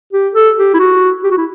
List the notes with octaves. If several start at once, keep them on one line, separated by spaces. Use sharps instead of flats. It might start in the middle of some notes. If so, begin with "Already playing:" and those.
G4
A4
G4
E4
F#4
G4
F#4
E4